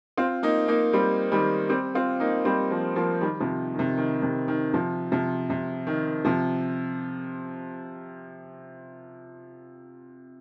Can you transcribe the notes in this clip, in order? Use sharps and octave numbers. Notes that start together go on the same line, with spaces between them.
C4 F4
A#3 D#4
A#3 D#4
G3 C4
D#3 G3
G3 C4
C4 F4
A#3 D#4
G3 C4
F3 A#3
F3 A#3
D#3 G3
C3 F3
D#3
C3
D#3
C3
D#3
C3 F3
C3 F3
C3
D#3
C3 F3